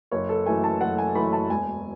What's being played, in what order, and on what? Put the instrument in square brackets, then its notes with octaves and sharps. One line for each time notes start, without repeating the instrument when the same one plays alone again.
[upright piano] F#1 C#5
A4
F#2 E3 A3 G#5
A5
F#1 F#5
G#5
F#2 E3 A3 B5
A5
E1 G#5